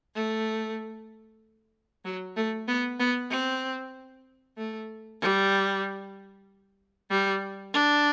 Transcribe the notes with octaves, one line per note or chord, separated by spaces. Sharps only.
A3
F#3
A3
B3
B3
C4
A3
G3
G3
D4